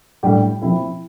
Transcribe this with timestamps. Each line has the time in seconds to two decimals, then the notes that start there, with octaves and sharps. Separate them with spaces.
0.23 A2 G3 D4 G4
0.62 F3 C4 E4